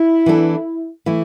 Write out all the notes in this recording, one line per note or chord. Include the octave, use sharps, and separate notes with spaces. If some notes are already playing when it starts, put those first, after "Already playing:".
Already playing: E4
E3 B3 D4 A4
E3 A3 E4